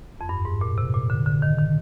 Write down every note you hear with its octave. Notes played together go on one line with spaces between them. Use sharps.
F2
G2
G#2
A#2
C3
A#2
D3
D3
D#3
D#3